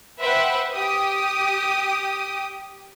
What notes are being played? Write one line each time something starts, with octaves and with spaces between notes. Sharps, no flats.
B4 C5 E5 F#5 G5
G4 D#6